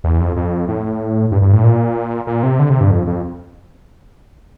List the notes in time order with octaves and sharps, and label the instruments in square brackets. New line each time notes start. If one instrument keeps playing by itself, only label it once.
[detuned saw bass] E2
F2
F2
A2
G2
G2
A2
A#2
A#2
C3
D3
C3
G2
F2
F2